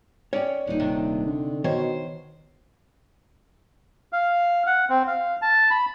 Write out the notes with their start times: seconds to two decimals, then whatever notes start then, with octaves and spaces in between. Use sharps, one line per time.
0.33 C#4 C#5 D5 G5
0.67 D#1 D3 D#4
0.79 C3 D#3 D4
1.27 D3
1.64 B2 D#3 C5 C#5
4.13 F5
4.66 F#5
4.90 C4
5.08 F5
5.42 A5
5.70 B5